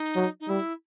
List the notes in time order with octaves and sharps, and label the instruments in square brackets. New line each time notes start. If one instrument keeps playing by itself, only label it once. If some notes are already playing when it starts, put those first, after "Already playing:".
Already playing: [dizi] D#4
[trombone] F#3
[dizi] D#4
[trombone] G3 [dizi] E4